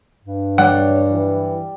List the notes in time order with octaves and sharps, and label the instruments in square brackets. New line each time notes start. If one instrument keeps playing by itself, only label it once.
[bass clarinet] G2
[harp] G3 [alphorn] C#5 [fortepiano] F#5
[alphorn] E3